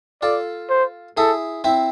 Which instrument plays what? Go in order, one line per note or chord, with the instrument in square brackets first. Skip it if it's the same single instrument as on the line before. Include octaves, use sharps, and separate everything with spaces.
[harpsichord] F4 A4 [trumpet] D5
[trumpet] C5
[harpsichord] E4 G#4 [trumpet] A4
[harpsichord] C4 E4